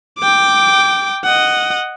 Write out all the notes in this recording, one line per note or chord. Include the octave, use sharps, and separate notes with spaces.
G5 D6
D#5 F#5